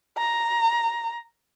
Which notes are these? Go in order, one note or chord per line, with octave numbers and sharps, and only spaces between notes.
A#5